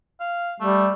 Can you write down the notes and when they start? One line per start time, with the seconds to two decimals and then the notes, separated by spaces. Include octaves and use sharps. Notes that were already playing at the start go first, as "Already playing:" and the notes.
0.20 F5
0.61 G3 A3